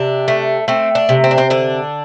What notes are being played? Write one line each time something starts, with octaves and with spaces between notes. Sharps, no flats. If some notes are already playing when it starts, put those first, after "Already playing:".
Already playing: C3 D4
A3
A3 C4
D4
C3
C4
D4
C4
D3 D4